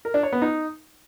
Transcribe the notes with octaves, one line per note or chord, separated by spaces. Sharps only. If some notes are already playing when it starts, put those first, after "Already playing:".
A#4
D4
C#5
B3
D#4